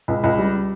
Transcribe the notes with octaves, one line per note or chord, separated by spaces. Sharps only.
C#2
C#2
G3